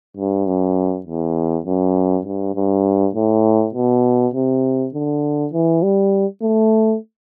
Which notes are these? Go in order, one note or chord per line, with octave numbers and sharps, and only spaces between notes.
G2
F#2
E2
F#2
G2
G2
A2
B2
C3
D3
E3
G3
A3